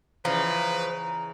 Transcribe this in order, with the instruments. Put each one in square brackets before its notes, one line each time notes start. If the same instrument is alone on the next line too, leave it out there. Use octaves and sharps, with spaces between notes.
[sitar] E2 C#3 E3 [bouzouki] F3 [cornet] B4 [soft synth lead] A#5